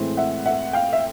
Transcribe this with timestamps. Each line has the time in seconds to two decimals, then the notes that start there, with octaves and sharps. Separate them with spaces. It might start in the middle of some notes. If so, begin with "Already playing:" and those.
Already playing: A2 E3 G#3 C4
0.17 E5 F#5
0.46 E5 F#5
0.73 F5 G5
0.93 E5